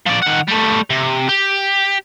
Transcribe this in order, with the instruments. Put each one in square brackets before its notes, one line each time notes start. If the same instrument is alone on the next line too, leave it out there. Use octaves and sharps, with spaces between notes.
[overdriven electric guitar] F3 D5
D#3 F#5
G3 A3
C3
G4